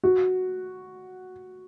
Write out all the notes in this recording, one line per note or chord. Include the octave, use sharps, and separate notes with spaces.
F#4